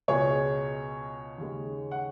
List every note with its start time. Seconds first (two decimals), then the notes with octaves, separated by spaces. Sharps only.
0.08 C#2 B2 G#3 G#4 C#5
1.38 D#2 C#3 G#3
1.91 F#5